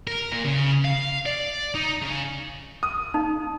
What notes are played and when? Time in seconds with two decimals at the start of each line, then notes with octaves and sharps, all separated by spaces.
0.07 A#4
0.33 A#2
0.45 C#3
0.85 F5
1.26 D5
1.74 D#4
2.01 C#3
2.83 D#6
3.14 D#4